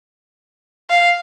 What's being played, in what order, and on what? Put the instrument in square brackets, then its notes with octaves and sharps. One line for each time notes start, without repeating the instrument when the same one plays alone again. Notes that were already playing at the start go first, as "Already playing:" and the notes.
[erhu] F5